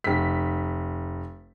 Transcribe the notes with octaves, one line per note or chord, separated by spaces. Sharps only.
F1 B6